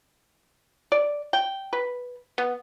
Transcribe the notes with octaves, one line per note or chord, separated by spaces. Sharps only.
D5
G5
B4
B3